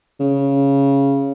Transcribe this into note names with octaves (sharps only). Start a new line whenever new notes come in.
C#3